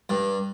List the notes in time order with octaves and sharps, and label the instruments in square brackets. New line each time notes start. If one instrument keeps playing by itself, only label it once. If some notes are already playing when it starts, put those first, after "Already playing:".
[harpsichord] G2